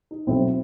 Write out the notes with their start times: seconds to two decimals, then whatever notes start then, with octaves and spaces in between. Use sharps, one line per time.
0.11 D#4
0.27 B1 B2 F#3 C4 E4